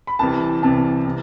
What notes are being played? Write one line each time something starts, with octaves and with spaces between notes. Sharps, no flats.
B5
C2 C3 E3 A5
C2 C3 E3 A5
C3 E3